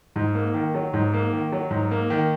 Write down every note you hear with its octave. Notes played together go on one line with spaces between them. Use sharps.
G#2
A#3
D#3
F#3
G#2
A#3
D#3
F#3
G#2
A#3
D#3